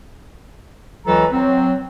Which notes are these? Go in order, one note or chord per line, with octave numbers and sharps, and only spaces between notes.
C#2 E3 F#3 A4 B4 A#5
F#3 C4